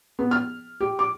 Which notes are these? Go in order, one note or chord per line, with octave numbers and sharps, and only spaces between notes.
B3
F6
G4
D6